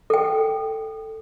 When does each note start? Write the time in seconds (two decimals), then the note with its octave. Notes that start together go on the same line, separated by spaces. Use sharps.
0.10 A4 G5